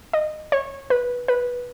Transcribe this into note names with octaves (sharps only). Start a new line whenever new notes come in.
D#5
C#5
B4
B4